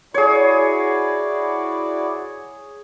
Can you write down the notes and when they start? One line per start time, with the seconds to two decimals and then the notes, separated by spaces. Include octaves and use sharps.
0.14 E4 F#4 G#4 C#5 D5